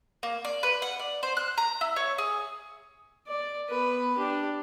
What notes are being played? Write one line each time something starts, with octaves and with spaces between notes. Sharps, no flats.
A#3
D5
B4
F#5
D5
C5
F#6
A#5
E4
C#5
G#4
D5
B3 B4
D4 G4